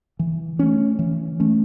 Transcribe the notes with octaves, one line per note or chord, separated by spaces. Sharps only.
E3
A3 C#4
E3
A3 C#4